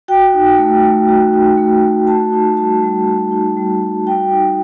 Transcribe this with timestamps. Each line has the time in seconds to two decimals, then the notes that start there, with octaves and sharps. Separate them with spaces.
0.08 F#4 G5
0.34 D#4
0.58 A3
0.83 A3
1.08 F#4
1.33 D#4
1.57 A3
1.83 A3
2.07 F#4 A5
2.33 D#4
2.57 G3 A5
2.83 G3
3.07 F#4
3.32 D#4
3.57 G3
3.82 G3
4.07 F#4 G5
4.31 D#4